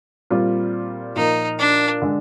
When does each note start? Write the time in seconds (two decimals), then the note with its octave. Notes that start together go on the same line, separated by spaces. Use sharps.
0.30 A#2 G3 C4 F4
1.15 A#2 F3 A#3 D#4
1.59 D4
2.02 D3 G#3 D4